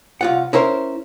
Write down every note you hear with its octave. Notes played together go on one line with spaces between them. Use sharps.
C2 F4 F#5
C#4 E4 A#4 C5